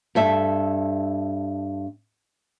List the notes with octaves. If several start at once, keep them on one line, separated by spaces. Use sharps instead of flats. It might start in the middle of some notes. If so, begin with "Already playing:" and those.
G2 A4 E5